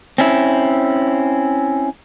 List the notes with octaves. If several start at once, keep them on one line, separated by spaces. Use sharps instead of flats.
C4 C#4 E4